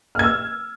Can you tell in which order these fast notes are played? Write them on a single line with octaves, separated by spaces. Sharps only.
F6 G#6 E6